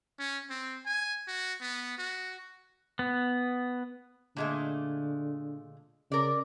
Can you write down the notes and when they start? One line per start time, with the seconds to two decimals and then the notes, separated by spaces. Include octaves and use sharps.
0.19 C#4
0.50 C4
0.85 G#5
1.27 F#4
1.61 B3
1.98 F#4
2.99 B3
4.36 A#2 D3 G#3 A3
6.12 C#3 A#4 D5